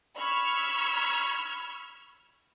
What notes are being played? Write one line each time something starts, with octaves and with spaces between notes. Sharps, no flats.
B5 C#6 E6 F6 G#6